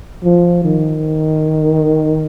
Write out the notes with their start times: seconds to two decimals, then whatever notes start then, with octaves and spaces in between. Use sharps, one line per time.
0.24 F3
0.65 D#3